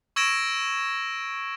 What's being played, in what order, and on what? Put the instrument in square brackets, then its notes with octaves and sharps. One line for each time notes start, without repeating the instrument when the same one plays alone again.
[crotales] C#6 E6 G#6 A#6 D7 E7